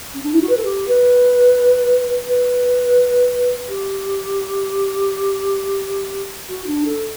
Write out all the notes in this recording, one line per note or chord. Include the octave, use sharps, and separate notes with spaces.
C#4
D4
E4
F#4
B4
A4
G4
B4
B4
G4
F#4
D4
A4